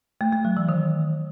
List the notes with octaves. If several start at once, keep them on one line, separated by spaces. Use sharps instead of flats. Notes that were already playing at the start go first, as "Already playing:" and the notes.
A3
A3
F#3
E3
D#3